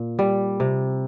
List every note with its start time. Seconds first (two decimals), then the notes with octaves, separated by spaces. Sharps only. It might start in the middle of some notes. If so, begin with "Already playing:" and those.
Already playing: A#2
0.19 G3
0.60 C3